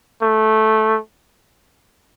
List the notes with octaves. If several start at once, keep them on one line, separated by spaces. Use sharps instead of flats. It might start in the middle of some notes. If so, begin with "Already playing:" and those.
A3